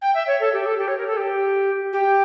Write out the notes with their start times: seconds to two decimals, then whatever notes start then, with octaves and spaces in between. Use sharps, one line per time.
0.02 G5
0.14 E5
0.27 C#5
0.40 A4
0.53 G4
0.66 A4
0.78 G4
0.88 C#5
0.97 A#4
1.07 A4
1.17 G4
1.93 G4